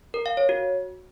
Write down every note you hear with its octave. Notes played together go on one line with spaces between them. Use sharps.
A#4
F5
C#5
F#4